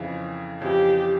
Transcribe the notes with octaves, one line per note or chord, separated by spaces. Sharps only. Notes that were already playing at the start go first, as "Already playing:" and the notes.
Already playing: F2 C#3 E3
F2 C#3 E3 G4